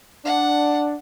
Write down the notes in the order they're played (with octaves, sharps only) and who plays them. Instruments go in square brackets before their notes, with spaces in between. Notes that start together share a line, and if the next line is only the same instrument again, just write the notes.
[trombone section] D4 [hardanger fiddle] F#5